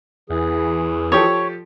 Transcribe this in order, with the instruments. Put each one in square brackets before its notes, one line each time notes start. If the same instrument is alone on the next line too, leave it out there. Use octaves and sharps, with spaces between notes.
[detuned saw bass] E2 [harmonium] E3 G#4
[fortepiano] F3 G4 A4 [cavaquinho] C#5